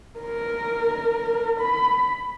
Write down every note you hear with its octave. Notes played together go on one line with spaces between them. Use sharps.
A#4
B5